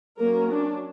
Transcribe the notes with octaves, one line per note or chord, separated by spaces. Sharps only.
F#3 A#3 C#4 A#4
D4